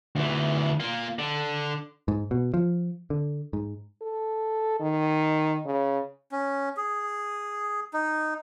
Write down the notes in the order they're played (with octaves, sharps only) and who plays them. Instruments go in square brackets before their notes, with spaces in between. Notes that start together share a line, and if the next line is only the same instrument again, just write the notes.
[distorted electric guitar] D2 E3
A#3 F4
D3
[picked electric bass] G#2
B2
F3
D3
G#2
[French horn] A4
D#3
C#3
[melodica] C#4
G#4
D#4